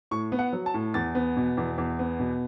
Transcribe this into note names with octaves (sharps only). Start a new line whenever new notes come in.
A2 C#6
B3
F#5
F#3
A5
A2
E2 A6
B3
B2
E2
E2
B3
B2